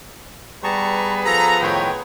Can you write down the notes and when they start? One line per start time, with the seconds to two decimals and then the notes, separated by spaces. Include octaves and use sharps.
0.64 G3 B3 G#4 B4 A5 A#5 C#6
1.26 F3 A4 A#5
1.61 A2 D#3 C5 C#5 G5